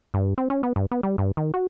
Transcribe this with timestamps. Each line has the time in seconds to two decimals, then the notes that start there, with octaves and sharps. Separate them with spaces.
0.14 G2
0.38 C4
0.50 C#4
0.63 B3
0.76 G2
0.91 B3
1.03 G3
1.18 G2
1.37 D#3
1.54 F#4